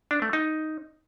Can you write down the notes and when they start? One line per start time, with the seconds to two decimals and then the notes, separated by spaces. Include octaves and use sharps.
0.11 D4
0.22 A3
0.33 D#4